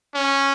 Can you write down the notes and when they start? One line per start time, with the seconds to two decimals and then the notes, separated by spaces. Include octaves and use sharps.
0.15 C#4